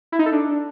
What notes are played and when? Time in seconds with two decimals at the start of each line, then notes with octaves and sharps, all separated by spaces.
0.12 E4
0.19 D#4
0.26 A4
0.32 D4